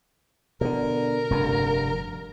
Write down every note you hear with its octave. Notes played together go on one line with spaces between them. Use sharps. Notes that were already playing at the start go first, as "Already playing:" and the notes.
B2 D3 A#4
F1 G2 D3